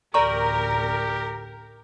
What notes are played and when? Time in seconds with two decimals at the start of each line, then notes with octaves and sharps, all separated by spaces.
0.14 A1 D2 G4 A#4 D5 A#5 C#6